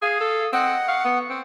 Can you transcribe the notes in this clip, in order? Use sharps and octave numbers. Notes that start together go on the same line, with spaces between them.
G#4 F5 D#6
A4
C4 D#5 F#5
F5 C#6
B3
C4